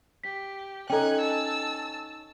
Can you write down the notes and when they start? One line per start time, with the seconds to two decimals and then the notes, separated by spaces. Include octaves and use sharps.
0.23 G4 B6
0.90 C#4 D#4 A4 G5 F#6 G#6
1.20 A5 E6